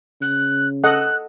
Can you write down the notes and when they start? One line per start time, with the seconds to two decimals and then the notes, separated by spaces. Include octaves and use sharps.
0.21 C#3 F#6
0.84 A4 D#5 F#5 F#6